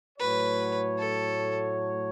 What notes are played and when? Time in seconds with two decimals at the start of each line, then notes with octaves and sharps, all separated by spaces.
0.19 A2 F#3 A3 F#4 B4 C#5
0.98 A4